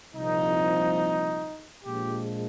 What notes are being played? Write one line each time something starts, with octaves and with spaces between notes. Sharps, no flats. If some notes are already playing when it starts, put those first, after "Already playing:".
C2 A#2 F3 D#4
A#1 A#2 F3 G#3 G4